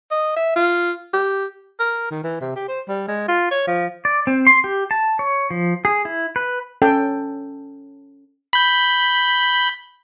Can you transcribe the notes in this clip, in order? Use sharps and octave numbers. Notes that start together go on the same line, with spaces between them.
D#5
E5
F4
G4
A#4
D#3
E3
C3
G4
C5
G3
G#3
F4
C#5
F3
D5
C4
C6
G4
A5
C#5
F3
G#4
E4
B4
C#4 A4 G5
B5 G6